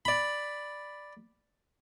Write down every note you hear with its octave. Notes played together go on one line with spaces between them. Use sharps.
D5 B5